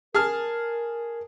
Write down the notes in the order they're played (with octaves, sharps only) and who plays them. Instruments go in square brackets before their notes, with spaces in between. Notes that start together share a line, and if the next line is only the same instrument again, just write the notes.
[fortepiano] G#4 A5 F6 [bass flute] A#4